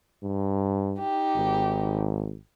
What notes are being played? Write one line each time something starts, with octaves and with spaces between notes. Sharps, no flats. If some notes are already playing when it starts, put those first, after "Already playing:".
G2
D#4 G4
G#1